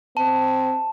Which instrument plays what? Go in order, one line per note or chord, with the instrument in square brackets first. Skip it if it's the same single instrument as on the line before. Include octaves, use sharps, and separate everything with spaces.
[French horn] C4 [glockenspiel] A5